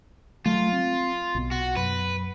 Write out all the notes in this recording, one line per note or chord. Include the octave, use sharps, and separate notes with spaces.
F#3 A3 F4
C4
B1 B2
F#4
F#2 B4